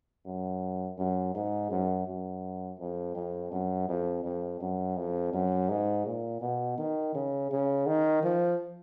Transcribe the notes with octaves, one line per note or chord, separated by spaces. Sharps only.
F#2
F#2
G#2
F#2
F#2
F2
F2
F#2
F2
F2
F#2
F2
F#2
G#2
A#2
B2
D#3
C#3
C#3
D#3
F3